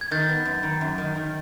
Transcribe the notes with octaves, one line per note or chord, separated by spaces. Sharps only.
G#6
D#3 G6 A6
B3
F#2
D#3
F#2
D#3
D#3